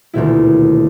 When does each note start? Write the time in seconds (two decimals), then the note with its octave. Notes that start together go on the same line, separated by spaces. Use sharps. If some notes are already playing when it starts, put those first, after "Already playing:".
0.14 D#1 D2 B2 E4